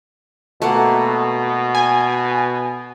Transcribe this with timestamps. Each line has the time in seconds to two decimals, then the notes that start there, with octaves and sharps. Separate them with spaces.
0.62 B2 A3 A#3 F#5
1.75 G#5